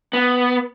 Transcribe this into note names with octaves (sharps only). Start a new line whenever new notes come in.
B3